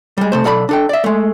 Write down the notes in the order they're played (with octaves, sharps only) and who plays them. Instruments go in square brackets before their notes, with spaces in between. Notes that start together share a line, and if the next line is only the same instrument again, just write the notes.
[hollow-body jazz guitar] G3 G#3
C3 A3 C5
B1 A4 D5 A5 B5
D4 A4 G5
D5 E5
G#3 A3